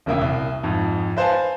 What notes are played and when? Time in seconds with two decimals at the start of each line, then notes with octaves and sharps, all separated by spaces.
0.06 E1 C#3 A#3 E4 G5 D#6
0.21 C2
0.63 F2 G#2
1.17 B4 C5 F5 G#5 A5